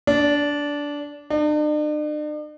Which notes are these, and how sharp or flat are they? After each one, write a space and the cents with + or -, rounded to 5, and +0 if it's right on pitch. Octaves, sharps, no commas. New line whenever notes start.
D4 -15
D4 +45